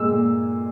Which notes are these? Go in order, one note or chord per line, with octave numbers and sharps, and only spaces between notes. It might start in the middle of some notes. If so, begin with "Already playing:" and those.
Already playing: A#2 G#3 A#3 E6
A#2